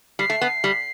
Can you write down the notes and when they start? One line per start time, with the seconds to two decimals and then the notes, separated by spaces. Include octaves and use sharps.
0.19 G3 C7
0.30 A3
0.41 B3
0.64 G3